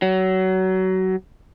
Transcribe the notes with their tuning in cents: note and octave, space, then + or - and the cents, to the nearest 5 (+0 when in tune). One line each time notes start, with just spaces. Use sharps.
F#3 +25